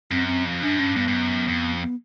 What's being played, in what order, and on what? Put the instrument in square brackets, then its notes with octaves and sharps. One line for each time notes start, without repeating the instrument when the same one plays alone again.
[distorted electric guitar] F#2 [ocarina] C4
[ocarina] C4
[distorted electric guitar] F2
[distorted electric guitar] F#2 [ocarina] D4
[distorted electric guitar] G2 [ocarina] C#4
[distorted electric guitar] G2 [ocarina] B3
[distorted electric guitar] G2
F#2
F2
[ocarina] B3